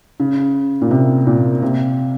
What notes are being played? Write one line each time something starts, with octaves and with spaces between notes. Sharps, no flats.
C#3
A#2
C3
A#2
C3